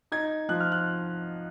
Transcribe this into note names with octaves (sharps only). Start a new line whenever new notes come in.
D#4 G#6
F3 F#6
F6
F#6